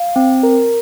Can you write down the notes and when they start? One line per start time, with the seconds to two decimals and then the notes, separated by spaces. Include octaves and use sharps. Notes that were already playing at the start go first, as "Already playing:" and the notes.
Already playing: F5
0.16 C4
0.43 A#4